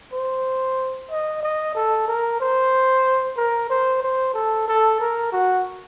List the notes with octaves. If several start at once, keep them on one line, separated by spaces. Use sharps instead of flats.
C5
D#5
D#5
A4
A#4
C5
A#4
C5
C5
A4
A4
A#4
F#4